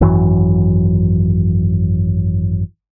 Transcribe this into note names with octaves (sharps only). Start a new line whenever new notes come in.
G#1 F#2 E3 F#3